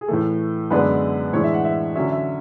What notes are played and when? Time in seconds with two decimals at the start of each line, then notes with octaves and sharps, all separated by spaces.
0.01 G#4
0.08 A2 E3 A3 A4
0.70 F#2 D3 G#3 B3 D4 B4
1.33 A2 E3 G#3 D4 C#5
1.44 E5
1.54 F#5
1.64 E5
1.95 D3 F#3 C#4 E5
2.11 E5